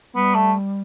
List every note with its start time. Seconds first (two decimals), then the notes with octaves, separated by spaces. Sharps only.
0.15 G3 B3
0.35 A3